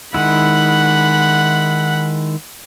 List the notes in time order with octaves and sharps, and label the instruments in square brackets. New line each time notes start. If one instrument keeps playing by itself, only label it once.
[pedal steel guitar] D#3 G#3 E4 [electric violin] F#5 B5